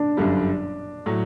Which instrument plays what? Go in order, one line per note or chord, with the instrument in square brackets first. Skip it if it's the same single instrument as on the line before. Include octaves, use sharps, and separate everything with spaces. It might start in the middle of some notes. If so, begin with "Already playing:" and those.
Already playing: [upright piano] D4
[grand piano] G1 F#2 D3 G3
A2 F#3